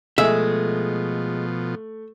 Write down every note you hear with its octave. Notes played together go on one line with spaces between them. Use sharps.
B2 F3 G#3 A3 E5